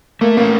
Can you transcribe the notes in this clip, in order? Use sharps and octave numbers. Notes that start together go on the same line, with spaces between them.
A3 A#3
A#3 C#4